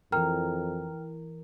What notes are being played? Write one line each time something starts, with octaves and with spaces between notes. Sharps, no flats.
F2 E3 A#4 G5 A#5 F6